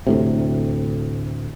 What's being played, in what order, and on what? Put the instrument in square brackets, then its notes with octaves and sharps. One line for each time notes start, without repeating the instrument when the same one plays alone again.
[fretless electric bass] D2 A2 C3